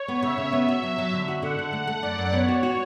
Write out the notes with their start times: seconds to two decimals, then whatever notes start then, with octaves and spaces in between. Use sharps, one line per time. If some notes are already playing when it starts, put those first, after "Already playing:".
Already playing: C#5
0.08 B3
0.23 C#3 E5
0.38 C#3
0.53 B3
0.68 F#4
0.83 F#3
0.98 F#3
1.13 D3
1.28 F#4
1.42 D3 F#5
1.59 D3
1.73 A3
1.87 A3
2.02 F#2 D5
2.18 F#2
2.33 B3 C#5
2.48 F#4
2.63 F#4